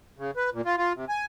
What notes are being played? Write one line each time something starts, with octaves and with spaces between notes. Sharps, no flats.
C#3
B4
A#2
F4
F4
C3
G#5